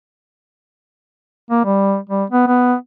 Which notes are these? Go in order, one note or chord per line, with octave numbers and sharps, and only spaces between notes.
A#3
G3
G3
B3
B3